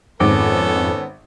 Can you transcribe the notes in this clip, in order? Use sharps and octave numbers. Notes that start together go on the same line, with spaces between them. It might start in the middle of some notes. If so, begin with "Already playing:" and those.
G#1 F2 G#2 B3 C#4 A4 D6